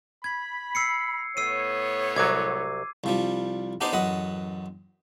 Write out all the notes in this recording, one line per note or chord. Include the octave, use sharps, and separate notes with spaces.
B5 G#6
E6 C7 C#7
A2 B3 C#5 E6 C7 D#7
C2 F#3 D6 G#6
C2 F3 G3
B3 D4 D#4 G4 C5 D5
A1 F#2 B4 D#5 F#5